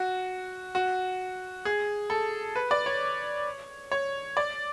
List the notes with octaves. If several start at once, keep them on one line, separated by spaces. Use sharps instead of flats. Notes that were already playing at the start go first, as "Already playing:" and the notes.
Already playing: F#4
F#4
G#4
A4
B4
D5
C#5
C#5
D5